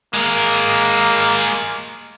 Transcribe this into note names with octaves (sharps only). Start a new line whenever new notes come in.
G#3 A#3 A#4